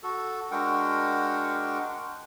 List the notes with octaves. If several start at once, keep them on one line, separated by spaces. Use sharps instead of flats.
F#4 A4
G#3 D4 F#4 A#4 F#5 G5